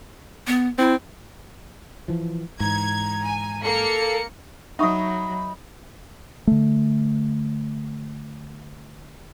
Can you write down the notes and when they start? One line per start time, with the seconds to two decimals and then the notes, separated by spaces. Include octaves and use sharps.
0.47 B3
0.78 C4 E4
2.08 E3 F3
2.60 G#2 E3 A#5 G#6
3.24 G#5
3.64 A#3 A4 C#7
4.79 F#3 D#4 E5 F#5 B5 C#6 D#6
6.47 D3 A3